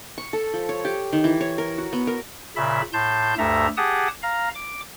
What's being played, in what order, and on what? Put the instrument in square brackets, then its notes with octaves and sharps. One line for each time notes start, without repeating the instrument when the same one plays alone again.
[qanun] C#6
A4
F3
C#5
G4
D#3
E3
C#5
A#4
F#4
B3
A#4
[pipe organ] A#2 C#3 E5 B5
A2 A5 C6 G6
D2 G2 A3 A4 E5 A#5
G4 G#4 F#5 A5 D#6
F5 A#5
D6